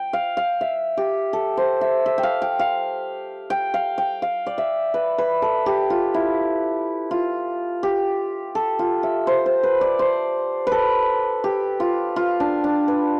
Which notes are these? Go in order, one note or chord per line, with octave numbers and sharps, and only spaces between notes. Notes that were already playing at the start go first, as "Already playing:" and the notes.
Already playing: G5
F5
F5
E5
G4
A4
C5
E5
E5
G5
F5
G5
F5
G5
F5
G5
F5
D5
E5
B4
B4
A4
G4
F4
E4
F4
G4
A4
F4
E5
C5
C5
B4
D5
C5
A4 B4
G4
F4
F4
D4
D4
B4